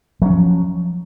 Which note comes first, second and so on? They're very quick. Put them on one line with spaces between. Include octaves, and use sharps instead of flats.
F#3 C#4 F3